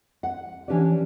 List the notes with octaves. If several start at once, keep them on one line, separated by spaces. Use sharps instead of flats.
F#5
E3 C#4 D4 G4 B4 D5